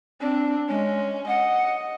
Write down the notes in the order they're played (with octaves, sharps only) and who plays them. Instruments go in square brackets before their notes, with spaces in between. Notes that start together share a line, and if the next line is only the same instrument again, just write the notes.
[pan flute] C4 [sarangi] D4
[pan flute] G#3 [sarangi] C#4
[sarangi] D#5 [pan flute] F#5